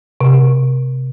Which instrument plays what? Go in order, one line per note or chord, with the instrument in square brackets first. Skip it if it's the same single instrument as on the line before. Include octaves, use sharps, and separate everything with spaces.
[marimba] C3